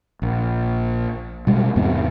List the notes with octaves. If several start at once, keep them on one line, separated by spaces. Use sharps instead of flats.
A#1
B2 G3 G#3
E2 G#2 C3 B3